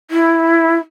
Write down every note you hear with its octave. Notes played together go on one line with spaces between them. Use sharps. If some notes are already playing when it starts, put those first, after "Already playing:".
E4